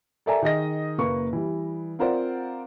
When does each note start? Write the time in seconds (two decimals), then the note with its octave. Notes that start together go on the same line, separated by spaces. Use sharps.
0.26 A4 A#4 D5 E5 G#5 A#5
0.42 D#3 G#4 D#5 A#6
0.98 F#1 A#3 B4 C#6
1.33 E3 G3
1.99 C4 F4 A#4 C5 D5 F#5